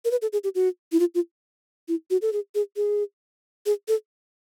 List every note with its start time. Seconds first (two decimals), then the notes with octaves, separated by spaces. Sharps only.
0.05 A#4
0.11 B4
0.22 A4
0.33 G#4
0.44 G4
0.55 F#4
0.92 E4
1.00 F4
1.15 F4
1.88 E4
2.10 F#4
2.22 A4
2.33 G#4
2.55 G#4
2.77 G#4
3.66 G#4
3.88 A4